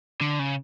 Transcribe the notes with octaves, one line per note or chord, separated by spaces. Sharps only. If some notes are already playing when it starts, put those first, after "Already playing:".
D3
C#3